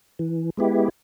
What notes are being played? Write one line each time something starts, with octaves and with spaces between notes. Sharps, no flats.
E3
G#3 B3 E4 G4